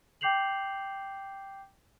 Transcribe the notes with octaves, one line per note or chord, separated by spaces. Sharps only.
G5 D6 G6 C7 F7 F#7